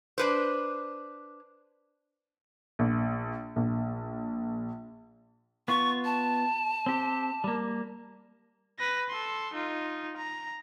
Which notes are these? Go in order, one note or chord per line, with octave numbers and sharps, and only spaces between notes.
D4 B4 C5
A#1
A#1
B3 F4 C#6
A5
C4 G4
G3 A#3
B4 A#6
A4 C6
D#4 F4
A#5